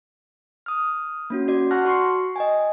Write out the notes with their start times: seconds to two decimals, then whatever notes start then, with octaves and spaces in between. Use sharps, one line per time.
0.66 D#6 F6
1.30 A#3 C#4 F#4
1.48 F#4 D5
1.71 F#5 A5 C#6 F6 F#6 A#6
1.85 F#4 C6 C#6 C7
2.36 D#5 G5 G#5